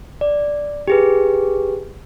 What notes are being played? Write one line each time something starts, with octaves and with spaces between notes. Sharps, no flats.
D5
G4 G#4 B4